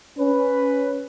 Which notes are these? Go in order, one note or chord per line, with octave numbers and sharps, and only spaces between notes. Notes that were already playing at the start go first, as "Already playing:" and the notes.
C#4 B4